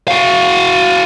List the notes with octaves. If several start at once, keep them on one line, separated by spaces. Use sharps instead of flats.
F#4 F5